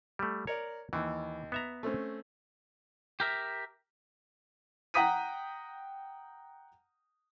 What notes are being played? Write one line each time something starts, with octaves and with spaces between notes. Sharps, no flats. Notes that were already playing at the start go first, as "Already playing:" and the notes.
G3 A3
A#4 C#5 D5
D#2 E3
B3 E5 A#5
A3 C4 C#4
G4 A#4 E5
F#5 G5 A#5 D#6 B6 D#7